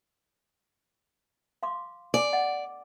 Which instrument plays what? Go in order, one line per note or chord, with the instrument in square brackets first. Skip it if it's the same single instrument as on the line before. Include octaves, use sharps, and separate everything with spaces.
[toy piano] F5 C6 D6
[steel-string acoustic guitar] D5 [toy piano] G#5
[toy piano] D#5 F#5